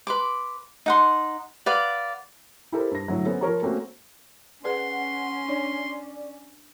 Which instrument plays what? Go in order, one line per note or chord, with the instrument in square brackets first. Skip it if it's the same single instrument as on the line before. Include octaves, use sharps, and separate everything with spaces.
[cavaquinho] B4 C6 D6
D#4 F#5 C6
B4 D5 F5 F#5
[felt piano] E4 G4 A4 A#4 C5
G2 A#6
A2 D3 F#3
B3 C#4 A4 C5
F3 A#4 C#5 A#5
A3 A#3 C4 C#4 F#4
[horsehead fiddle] C#4 [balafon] G#4 B4 D5 [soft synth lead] F#5 [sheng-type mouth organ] C6
[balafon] D4 C#5 [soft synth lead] D5